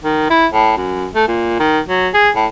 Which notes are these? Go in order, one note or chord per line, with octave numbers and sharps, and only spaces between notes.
D#3
E4
A2
F#2
A3
A#2
D#3
F#3
G#4
A2